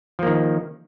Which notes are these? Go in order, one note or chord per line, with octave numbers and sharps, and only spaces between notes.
D#3 F3 A#3